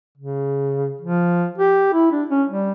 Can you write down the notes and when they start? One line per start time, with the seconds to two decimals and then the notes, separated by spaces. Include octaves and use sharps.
0.18 C#3
1.01 F3
1.58 G4
1.93 E4
2.12 D4
2.29 C#4
2.49 G3